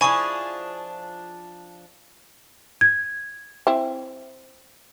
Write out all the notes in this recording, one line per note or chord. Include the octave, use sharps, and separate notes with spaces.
F3 D4 E4 G#4 G#5 C#6
G#6
C4 E4